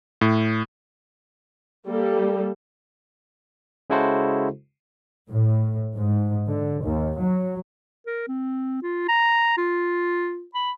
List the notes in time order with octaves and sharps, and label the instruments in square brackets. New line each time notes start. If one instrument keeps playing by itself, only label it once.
[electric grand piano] A2
[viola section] G3 A#3 A4
[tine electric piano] C#3 G#3 E4 F#4 A4 C5
[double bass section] A2
G#2
D3
D#2
F#3
[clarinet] A#4
C4
F4
A#5
F4
B5